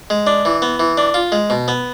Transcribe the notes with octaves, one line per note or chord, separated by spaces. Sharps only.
G#3
D4
E3
B3
E3
D4
F4
G#3
B2
B3